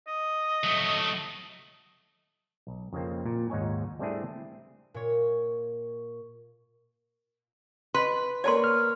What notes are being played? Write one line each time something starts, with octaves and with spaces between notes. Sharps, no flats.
D#5
F#3 A3
B1
F2 C#3 F3 A#3 C4
A#2
D#2 G#2 D#4 C#5 G#5
G3 A3 C4 D4 E4 G#4
A#2 C#5
B4 D#5 C6
A#3 A#4 C#5 D5 A5 C6
F6